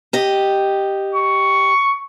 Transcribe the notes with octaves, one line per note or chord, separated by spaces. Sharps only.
G4 D#5
C#6